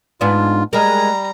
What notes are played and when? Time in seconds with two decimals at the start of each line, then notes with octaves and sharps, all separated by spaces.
0.21 G#2 B3 D4 F4
0.73 G3 G#3 A#4 A#5